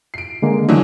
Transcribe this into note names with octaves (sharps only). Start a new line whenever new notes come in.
C7 D7
D3 G#3 A#3
D#3 E3 F#3 D4